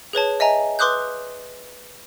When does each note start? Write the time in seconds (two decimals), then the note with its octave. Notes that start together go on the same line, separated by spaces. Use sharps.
0.13 G#4 B4 C#5 A5
0.40 D#5 E5 G#5 A#5
0.79 B4 C6 D6 D#6 F#6 G6